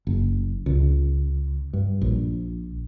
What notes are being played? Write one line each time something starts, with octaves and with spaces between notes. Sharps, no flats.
F#1
C#2
G2
A#1